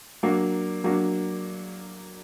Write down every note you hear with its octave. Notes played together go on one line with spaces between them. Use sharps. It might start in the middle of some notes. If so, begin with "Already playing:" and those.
F#3 A#3 D4
F#3 A#3 D4